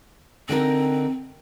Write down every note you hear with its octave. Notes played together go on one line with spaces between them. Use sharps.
D3 C4 D#4 A#4